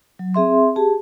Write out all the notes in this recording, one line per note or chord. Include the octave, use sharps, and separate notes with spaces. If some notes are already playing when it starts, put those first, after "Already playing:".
F#3
C4 G#4 E5 C6
G4 G#4 A5